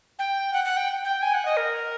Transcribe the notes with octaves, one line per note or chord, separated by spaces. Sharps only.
G5
F#5
F#5
G5
G5
G#5
F#5
D#5
A#4